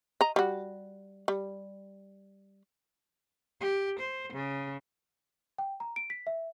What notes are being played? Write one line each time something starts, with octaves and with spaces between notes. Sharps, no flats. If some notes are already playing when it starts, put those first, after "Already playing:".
D#5 A#5
G3 F#4
G3
G4
C5
C#3
G5
A#5
D7
B6
E5